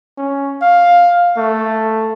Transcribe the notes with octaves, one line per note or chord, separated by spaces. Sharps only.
C#4
F5
A3